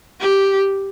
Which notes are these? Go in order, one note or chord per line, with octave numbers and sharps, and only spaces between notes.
G4